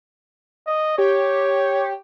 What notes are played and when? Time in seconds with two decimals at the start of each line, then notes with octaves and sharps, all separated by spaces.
0.67 D#5
0.98 G4 C#5